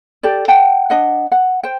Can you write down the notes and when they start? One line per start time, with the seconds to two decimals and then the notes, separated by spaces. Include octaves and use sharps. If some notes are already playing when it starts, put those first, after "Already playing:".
0.23 G4 A4 D5
0.48 F#5 G5 A5
0.90 D4 D#5 F#5
1.32 F#5
1.63 C5 G5